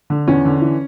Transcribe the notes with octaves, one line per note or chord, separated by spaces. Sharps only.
D3
E2 C#4
D3
E3